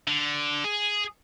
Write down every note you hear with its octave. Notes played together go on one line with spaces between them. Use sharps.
D3
G#4